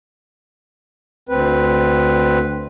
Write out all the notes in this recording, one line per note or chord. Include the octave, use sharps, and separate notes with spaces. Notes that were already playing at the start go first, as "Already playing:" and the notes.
D2 C4 B4